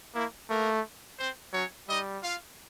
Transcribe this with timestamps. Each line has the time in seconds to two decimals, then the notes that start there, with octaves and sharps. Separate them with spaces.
0.15 A#3 E4
0.49 A3 A#3 A#4
1.18 C4 C5
1.53 F#3 C#4 C#5
1.88 G3 D#4 D#5
2.23 F4 F5